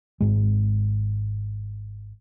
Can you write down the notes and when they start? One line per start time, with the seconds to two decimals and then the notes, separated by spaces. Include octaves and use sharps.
0.20 G#1 G#2 G#3